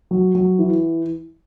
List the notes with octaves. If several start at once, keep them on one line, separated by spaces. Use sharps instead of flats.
F#3
F#3
E3